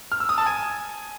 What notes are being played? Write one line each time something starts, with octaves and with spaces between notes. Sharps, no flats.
F6
E6
D#6
A5
G#5